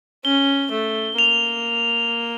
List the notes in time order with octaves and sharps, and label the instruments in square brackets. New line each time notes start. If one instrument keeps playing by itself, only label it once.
[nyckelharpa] C#4 [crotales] G7
[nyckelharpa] A3
[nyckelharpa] A#3 [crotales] F7